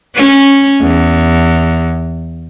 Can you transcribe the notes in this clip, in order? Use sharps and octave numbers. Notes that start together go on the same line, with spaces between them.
C#4
E2